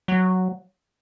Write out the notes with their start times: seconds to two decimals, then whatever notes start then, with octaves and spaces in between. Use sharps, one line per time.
0.08 F#3